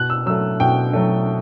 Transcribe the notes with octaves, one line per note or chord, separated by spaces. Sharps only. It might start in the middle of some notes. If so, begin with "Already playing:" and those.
Already playing: B2 F#6
E6
F#3 A3 E6
B2 G5
F#3 A3